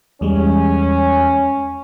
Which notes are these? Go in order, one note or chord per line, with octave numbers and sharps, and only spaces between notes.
E2 G3 G#3 C#4